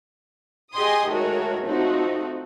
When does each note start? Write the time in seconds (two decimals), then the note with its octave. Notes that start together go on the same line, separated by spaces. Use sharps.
0.73 G4 G#4 D#5 G#5 C6 D#6
1.08 D#3 G#3 A3 F#4 A#4 C#5
1.65 F3 A3 C4 D#4 F#4